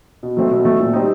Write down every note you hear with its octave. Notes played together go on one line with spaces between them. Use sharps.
B2
F#3 A3 C4
B2
F#3 A3 C4
A#2
G3 C4 D#4